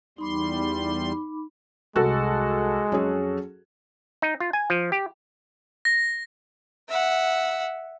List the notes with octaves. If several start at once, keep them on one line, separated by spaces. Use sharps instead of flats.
E2 G3 D#4 B5 C6 D6
C2 G#3 F#4 A4
F2 F#3 C#4 G#4
D#4
F4
G#5
F3
G4
A#6
E5 F#5